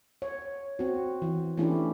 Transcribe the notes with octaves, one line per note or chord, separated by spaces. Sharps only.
C#5
C4 F#4
E3
E3 A3 C#4 D4 E4 G4